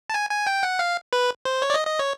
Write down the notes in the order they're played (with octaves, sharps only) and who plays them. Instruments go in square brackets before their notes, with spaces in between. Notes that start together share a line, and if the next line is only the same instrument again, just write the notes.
[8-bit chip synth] A5
G#5
G#5
G5
F#5
F5
B4
C5
C#5
D5
D#5
D#5
C#5